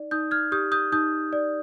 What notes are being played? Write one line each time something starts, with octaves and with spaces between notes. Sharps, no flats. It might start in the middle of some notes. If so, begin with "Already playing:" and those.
Already playing: D#4 D5
D#4 D#6 G6
F6 G#6
G4 D#6 G6
D#6 G6
D#4 D#6 G6
D5